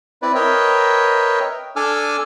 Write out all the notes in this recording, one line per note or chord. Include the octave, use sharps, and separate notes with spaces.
C4 E4 B4 D5
A#4 B4 C#5 D#5 E5 G5
D4 A4 G#5 D6 E6 F6